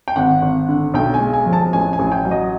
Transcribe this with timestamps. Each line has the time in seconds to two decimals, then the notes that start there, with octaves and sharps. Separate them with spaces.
0.08 G5
0.16 G#1 F#5
0.42 G#1
0.68 D3
0.94 B1 G5
1.14 G#5
1.20 G#3
1.33 G#5
1.46 F3
1.53 A5
1.73 A1 G#5
1.93 G#5
1.99 A1
2.12 G5
2.25 F#3
2.31 D#5